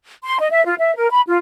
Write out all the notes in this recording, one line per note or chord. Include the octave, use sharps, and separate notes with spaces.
C6
D#5
E5
F4
E5
A#4
B5
F4